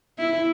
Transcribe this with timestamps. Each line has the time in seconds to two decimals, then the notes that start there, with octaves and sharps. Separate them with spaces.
0.19 E4